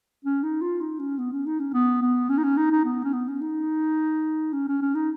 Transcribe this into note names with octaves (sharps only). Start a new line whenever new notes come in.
C#4
D#4
F4
D#4
C#4
B3
C#4
D#4
C#4
B3
B3
C#4
D#4
C#4
D#4
D#4
B3
C#4
B3
C#4
D#4
C#4
C#4
C#4
D#4